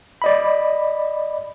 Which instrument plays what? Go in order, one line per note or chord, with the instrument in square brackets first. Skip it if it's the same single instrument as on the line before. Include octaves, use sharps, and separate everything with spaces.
[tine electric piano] D5 D#5 B5